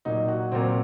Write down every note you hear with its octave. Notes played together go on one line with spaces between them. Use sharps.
A#2 F#3 D#4
F#4
A#2 F#3 C4